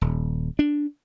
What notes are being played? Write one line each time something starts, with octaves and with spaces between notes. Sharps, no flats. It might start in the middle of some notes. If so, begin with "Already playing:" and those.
D#1
D4